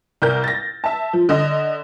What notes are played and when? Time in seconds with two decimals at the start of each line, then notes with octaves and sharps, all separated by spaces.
0.22 C2 A#4 G6
0.44 A6 A#6
0.84 E5 A5
1.13 F3
1.29 D3 D#5